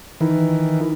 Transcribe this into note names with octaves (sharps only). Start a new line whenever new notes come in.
D#3 E3